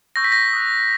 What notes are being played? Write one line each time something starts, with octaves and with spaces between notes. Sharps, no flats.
C#6 E6 G6 A#6
B6
A#6
D#6 F#6